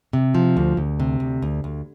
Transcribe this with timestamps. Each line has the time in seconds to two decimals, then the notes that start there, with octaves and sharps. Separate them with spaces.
0.13 C3
0.35 F3
0.57 D2
0.77 D2
1.00 C3
1.20 D2
1.42 D2
1.64 D2